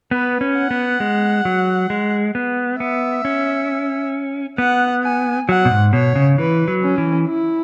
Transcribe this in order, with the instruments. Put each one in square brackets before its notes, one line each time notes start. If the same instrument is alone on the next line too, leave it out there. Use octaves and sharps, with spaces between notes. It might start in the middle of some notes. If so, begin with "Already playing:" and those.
[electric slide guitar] B3 [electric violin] B4
[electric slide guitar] C#4
[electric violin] F#5
[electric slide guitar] B3
G#3
F#3
G#3
B3
[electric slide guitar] B3 [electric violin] E5
[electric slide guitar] C#4
[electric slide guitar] B3 [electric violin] F#5
[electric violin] G#5
[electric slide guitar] F#3 [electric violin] F#5
[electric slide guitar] B2
G#2
[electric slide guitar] B2 [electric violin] C#5
[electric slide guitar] C#3
[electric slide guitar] E3 [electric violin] B4
[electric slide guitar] F#3
[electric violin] C#4
[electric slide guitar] E3
[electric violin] E4